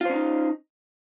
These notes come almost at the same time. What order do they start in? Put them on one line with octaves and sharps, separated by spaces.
F4 C5 C#4 D#4